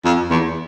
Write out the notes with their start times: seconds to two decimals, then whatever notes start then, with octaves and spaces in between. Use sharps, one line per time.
0.05 F2
0.30 E2